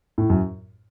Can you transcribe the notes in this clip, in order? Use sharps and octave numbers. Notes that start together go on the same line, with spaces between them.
A2
F#2